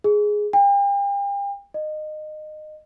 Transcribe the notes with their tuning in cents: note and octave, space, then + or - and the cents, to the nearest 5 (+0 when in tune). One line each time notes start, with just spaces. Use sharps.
G#4 +5
G5 +40
D#5 -20